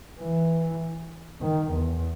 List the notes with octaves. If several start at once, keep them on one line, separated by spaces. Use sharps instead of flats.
E3
D#3
E2